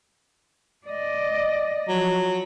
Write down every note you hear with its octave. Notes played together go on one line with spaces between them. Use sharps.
D5 D#5
F3 F#3